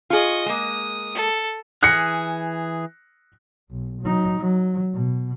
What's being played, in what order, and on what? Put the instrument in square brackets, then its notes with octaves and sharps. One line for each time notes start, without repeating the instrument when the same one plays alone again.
[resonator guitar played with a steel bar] F4 G#4 [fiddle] D#5 C#6
[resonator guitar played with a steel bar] G#3 A#3 [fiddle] D#6
[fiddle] A4
[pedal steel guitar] E3 G#4 F6 [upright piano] F#6 A#6 C#7
[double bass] B1
F#3 D#4
F#3
B2